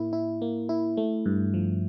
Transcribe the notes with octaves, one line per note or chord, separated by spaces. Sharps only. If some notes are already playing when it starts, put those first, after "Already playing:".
Already playing: A2 A#3 E4
E4
A#3
E4
A3
G2
F3